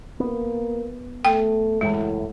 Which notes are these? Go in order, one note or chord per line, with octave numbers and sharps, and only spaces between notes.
A#3 B3
A3 G5
F#1 E2 A2 G#3